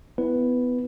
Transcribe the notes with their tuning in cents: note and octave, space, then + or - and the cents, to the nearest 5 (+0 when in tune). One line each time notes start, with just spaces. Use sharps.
B3 +15 E4 +0 B4 +0